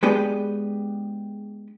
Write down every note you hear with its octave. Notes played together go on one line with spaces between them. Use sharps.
G#3 B3 D4 G4 G#4 B4